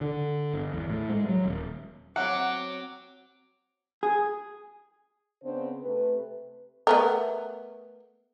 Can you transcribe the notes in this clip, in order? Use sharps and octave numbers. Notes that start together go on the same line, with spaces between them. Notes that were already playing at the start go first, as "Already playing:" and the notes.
D3
G1
E2
A2
G#3
F#3
D#1
F#3 C4 F#5 D6
G#4
C#3 B3 C4 D4 C5
C3 A3 B4
A3 B3 A#4